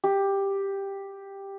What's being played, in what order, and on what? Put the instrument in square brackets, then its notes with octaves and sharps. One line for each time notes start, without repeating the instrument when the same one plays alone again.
[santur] G4